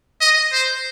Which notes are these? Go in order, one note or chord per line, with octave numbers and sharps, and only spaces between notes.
D#5
C5